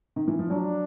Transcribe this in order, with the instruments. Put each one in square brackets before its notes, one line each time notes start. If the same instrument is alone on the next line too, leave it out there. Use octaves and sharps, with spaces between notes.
[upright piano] D#3
E3
F3
[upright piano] F#3 [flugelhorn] D4